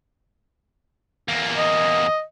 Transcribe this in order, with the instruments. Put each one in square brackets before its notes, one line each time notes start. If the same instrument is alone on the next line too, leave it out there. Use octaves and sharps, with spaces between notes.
[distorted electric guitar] E2 A#3
[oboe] D#5